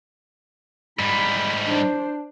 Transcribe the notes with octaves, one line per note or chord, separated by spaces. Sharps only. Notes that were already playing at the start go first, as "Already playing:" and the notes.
G#2 G3 B5
D4 C5